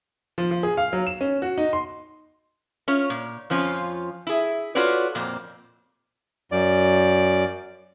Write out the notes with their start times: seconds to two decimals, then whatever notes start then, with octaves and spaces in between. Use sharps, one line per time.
0.38 F3
0.51 F3
0.63 G#4
0.77 F5
0.93 F#3
1.07 E7
1.21 C#4
1.42 F#4
1.58 D#4
1.73 C6
2.88 C#4 F4 C#5
3.10 A#2
3.50 F2 F3 C#4 F4
4.27 E4 G#4
4.75 F4 F#4 A4 B4 C#5 D5
5.15 F2 A#2 A#3 C4
6.52 F#2 D5